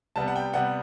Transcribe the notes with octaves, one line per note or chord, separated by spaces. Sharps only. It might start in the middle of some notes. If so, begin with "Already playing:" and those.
C3 G3 B3 A5
F#5
G5
C3 G3 B3 F#5